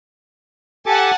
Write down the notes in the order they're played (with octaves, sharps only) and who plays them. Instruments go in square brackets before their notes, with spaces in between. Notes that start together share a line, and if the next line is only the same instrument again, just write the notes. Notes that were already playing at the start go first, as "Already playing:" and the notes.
[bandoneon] G4 A4 D6 [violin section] F#5 G#5 A5